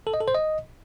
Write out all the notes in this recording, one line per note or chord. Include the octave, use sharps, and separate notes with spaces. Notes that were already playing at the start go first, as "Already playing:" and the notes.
A4
D#5
A4
C5
D#5